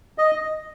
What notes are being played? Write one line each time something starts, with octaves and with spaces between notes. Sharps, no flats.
D#5